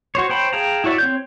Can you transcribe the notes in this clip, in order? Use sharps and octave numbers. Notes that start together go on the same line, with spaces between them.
F#4 C5 C#5
C5 C#5 G5 A5 B5
G#4 F5 G5 A5 A#5
E4 F#4 C#5 D5 E5
C4 C#5 G6